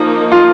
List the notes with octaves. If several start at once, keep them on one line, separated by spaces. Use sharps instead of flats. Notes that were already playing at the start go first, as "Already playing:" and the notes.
Already playing: F3 A#3 D#4
F4